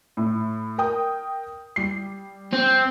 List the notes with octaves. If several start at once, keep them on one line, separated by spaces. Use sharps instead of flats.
A2
A#4 G5 D#6
G3 C7
C4